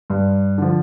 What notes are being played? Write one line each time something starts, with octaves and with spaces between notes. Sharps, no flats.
G2
D3 F3